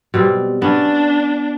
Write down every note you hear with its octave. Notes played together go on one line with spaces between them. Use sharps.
B2 G3 C4
B3 C#4 D4